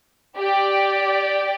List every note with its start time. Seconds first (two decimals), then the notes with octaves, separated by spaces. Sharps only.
0.38 G4 D5 G5